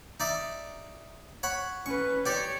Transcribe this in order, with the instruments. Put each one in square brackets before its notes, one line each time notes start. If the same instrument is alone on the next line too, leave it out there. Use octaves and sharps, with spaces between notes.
[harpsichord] D#4 D5 E5
C#5 F#5 B5
[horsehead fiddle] C#4 B4 [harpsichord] C#6
[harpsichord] G4 D5 [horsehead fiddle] C#5